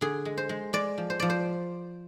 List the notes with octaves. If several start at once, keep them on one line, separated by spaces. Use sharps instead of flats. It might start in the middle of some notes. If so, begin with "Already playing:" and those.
D3 G#4
G#3
C5
G#3
G#3 D5
F3
C5
F3 D5
C5